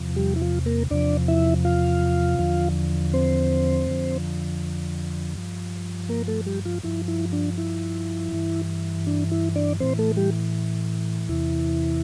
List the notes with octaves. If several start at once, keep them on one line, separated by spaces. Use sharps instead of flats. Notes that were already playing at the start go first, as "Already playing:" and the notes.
Already playing: E2 C3 F3
G3 G4
E4
F3 F4
A#3 A#4
E2 C3 F3 D4 D5
E4 E5
F4 F5
E2 D3 F3
C4 C5
F2 D3 F3
G2 F3
A#3 A#4
A3 A4
G3 G4
F3 F4
G2 F3 E4
E4
D4
E4
G2 E3
D4
E4
D4 D5
A2 E3 C4 C5
A3 A4
G3 G4
E2 C3 E3 E4